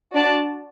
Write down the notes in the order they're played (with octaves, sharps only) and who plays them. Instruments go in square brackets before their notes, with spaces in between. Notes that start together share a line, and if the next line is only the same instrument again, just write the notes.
[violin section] D4 F#4 D5 A5